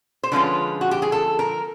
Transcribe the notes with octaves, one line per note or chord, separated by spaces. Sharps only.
C5
D3 F3 G#3 C#4 F4 B4
F#4
G4
G#4
A4
A#4